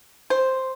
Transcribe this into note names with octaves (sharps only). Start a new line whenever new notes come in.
C5